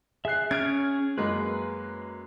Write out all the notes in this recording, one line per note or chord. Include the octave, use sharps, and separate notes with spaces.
G#4 E5 F#6 C7
C#4 G#4 F6 G#6 D7
F#2 G#3 A#3 B4